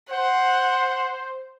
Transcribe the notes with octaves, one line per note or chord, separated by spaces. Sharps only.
C5 F#5